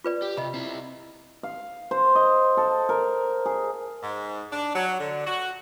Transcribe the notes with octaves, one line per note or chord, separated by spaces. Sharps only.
F4 B4 D5
G4
C3 D#5 B5
C4 E4
F5
C5
D#5
A4
A#4
G#4
G#2
D4
F#3
D3
F#4